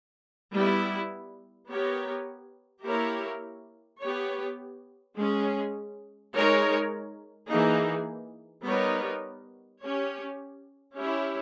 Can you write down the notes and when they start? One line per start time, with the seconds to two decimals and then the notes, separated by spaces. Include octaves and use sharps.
0.54 G3 B3 E4
1.70 B3 G4 A#4 C#5
2.86 A#3 E4 G4 A#4 C#5
4.02 B3 G4 C#5
5.17 G#3 C#4 G#4
6.33 G#3 D#4 A#4 C#5
7.49 E3 A#3 D#4 G#4
8.65 G3 B3 D#4 A#4 C#5
9.81 C#4 G4 C#5
10.97 C#4 E4 G4 C#5